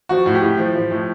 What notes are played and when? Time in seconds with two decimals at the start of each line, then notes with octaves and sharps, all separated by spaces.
0.09 F3 F#4
0.26 A2
0.34 G4
0.42 A2
0.58 F3
0.75 F3
0.91 A2